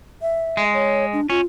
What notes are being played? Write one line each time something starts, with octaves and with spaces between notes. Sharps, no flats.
E5
G#3
C#5
D4
C#4 F4